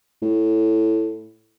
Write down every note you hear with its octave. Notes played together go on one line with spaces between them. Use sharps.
A2